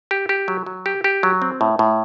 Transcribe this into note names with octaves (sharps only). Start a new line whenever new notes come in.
G4
G4
F#3
F#3
G4
G4
F#3
C4
A2
A2